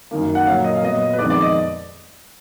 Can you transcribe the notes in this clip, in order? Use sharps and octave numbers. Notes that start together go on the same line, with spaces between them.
F#2 D#3 A#3
F#5
A#2 F#3 A#3 F5
D#5
F5
A#2 F#3 B3 D#5
B4
F2 D#3 G#3 B3 D5
D5
D#5